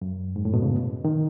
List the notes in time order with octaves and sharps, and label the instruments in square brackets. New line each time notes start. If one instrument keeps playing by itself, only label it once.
[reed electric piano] F#2
G#2
A2
B2
C#3
D#3